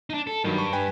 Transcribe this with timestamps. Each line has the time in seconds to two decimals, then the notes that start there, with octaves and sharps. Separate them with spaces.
0.10 D4 D#4
0.27 A4
0.44 G2 D#3 F#3
0.58 C#6
0.73 B4 G5 G#5